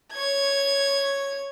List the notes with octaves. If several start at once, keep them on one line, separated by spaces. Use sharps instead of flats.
C#5 G#6